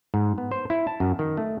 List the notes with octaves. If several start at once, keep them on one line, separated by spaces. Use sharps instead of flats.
G#2
B3
C5
E4
A5
F#2
D#3
A3